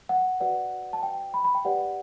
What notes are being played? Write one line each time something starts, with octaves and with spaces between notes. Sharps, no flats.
F#5
F#4 B4 D5 F#5
A5
G5
B5
B5
G5
G4 B4 D5 F#5